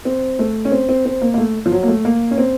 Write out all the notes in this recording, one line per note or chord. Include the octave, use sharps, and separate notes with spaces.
C4
A3
C#4
C4
C4
C4
A#3
A#3
A3
F3
F#3
A#3
A3
A#3
C#4
C4